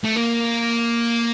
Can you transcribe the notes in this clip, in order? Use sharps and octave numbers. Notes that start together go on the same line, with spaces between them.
A3
A#3